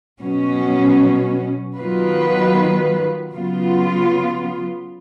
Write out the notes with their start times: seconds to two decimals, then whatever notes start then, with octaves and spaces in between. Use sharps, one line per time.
0.19 B2 F#3 C#4
1.76 D#3 F#3 B3 F4 B4
3.33 C#3 F#3 B3 F4